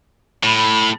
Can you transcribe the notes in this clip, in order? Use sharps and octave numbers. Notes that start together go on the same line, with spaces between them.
A2 B5